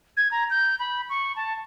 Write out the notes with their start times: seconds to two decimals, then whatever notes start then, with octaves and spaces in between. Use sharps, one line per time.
0.17 G#6
0.31 A#5
0.50 G6
0.79 B5
1.10 C#6
1.36 A5